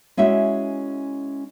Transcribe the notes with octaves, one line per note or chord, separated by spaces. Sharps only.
G#3 C#4 E4 F#4 E5